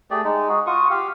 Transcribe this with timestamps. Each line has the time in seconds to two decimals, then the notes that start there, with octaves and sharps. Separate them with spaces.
0.11 A3 G4 G#4 D5
0.24 G#3 D#4
0.49 F#4 G#4
0.67 F4 F#4 C#6 D#6
0.90 G4 F5